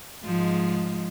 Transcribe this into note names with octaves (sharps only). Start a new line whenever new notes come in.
G#2 F3 G#3